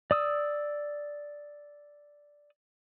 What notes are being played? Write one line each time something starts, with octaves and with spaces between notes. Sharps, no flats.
D5 D#6 E6